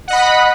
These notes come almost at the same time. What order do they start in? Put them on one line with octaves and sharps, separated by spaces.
F#5 D#5 B5